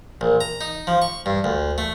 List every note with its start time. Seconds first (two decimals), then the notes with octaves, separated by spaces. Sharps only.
0.21 A#1
0.41 A#5
0.61 D#4
0.87 F3
1.02 C#6
1.26 G2
1.44 D2
1.78 A3